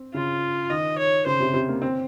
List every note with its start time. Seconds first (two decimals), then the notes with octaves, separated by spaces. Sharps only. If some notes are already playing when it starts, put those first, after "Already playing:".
Already playing: C4
0.14 C#3 F4
0.70 D#3 D#5
0.98 C#5
1.26 C#3 C5
1.40 C3
1.54 C3
1.69 A#3
1.82 C4